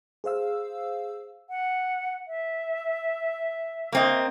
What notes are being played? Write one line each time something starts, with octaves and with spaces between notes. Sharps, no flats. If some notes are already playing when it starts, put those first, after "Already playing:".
G#4 C5 F5 E6
F#5
E5
A#3 C4 D#5